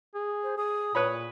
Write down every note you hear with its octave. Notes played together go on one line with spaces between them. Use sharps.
G#4
C5
G#4 D#6
A#2 B4 C#5 B5